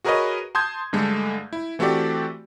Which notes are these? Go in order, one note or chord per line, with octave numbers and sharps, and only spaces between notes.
F#4 G#4 A#4 B4 C#5 D#5
A5 C6 D#6 G6 G#6
G2 D3 G#3 A3
E4
E3 A3 C4 F#4 G4 D5